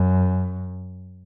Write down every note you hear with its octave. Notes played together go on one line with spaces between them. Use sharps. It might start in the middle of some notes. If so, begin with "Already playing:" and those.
Already playing: F#2